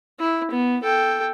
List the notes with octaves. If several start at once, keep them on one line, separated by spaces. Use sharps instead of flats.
E4
B3
A4 G5